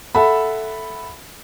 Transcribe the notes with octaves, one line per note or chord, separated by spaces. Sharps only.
A4 E5 F#5 B5